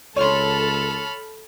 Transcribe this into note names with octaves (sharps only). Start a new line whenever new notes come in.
C#2 A4 C#5 B5 C6 F6